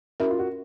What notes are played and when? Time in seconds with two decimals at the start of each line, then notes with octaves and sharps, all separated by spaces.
0.20 C#4 E4 F#4 A#4
0.30 F4
0.39 F#4